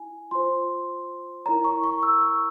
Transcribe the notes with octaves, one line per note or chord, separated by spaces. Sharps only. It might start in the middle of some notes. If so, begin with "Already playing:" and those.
Already playing: E4 G#5
F4 C5 C6
E4 A#4 C#5 A#5
C#6
C#6
E6
C#6